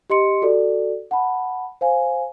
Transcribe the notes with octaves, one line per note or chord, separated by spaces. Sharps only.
G4 D#5 C6 C#7
F#4 A4 D5
F#5 A5 B5
C5 F5 G#5